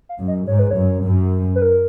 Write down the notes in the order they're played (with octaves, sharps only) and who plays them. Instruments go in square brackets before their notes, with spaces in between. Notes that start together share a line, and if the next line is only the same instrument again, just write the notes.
[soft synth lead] F5
[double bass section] F#2
[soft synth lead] D#5
[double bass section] G#2 [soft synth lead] C#5
[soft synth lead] B4
C#5
[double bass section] F#2
F#2
[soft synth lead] B4
A#4